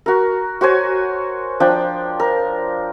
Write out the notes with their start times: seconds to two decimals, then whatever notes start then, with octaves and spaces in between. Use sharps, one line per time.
0.06 F#4 A#4
0.61 F#4 C5 C#5 G#5
1.60 F3 D4 G5
2.20 A#4